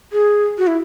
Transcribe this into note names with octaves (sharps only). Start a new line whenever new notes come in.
G#4
F#4
E4